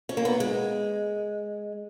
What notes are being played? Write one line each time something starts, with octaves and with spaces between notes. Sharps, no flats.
C#4
A#3
B3
G#3